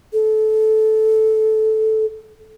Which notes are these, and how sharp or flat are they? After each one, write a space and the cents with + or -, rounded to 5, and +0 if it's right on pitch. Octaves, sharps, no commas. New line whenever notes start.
A4 -15